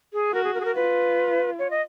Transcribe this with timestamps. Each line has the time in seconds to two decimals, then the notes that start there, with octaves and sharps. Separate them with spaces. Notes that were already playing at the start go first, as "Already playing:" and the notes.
0.13 G#4
0.33 F#4 A#4
0.44 G#4
0.54 A#4
0.60 G#4
0.65 A#4
0.75 F4 B4
1.59 C#5
1.70 D#5